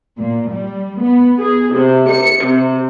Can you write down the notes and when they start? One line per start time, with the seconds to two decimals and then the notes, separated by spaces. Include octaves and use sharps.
0.20 A#2
0.51 G3
1.03 B3
1.39 G#4
1.75 C3
2.10 C#7
2.45 C3